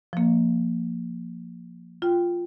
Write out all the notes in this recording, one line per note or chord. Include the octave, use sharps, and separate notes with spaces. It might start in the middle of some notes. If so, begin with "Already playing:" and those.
F3 A#3
F4 G5